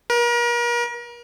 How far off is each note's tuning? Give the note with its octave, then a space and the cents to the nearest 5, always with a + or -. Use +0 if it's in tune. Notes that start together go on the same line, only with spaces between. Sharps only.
A#4 +40